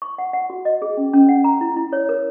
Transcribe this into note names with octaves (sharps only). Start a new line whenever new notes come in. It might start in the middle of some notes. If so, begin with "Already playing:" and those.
C#6
F#5
F#5
F#4
D#5
G#4
C#4
C#4
F#5
A#5
E4
E4
C#5
A#4